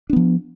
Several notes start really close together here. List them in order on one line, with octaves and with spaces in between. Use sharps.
D4 B3 F3